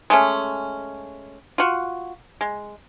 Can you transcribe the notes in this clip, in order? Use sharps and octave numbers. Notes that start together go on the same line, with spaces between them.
G#3 A3 C#4
F4 F#4
G#3